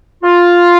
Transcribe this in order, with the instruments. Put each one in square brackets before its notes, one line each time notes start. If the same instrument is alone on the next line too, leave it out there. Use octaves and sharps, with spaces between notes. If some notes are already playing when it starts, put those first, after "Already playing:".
[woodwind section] F4